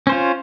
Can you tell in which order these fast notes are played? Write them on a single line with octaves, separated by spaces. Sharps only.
C#4 C5 F4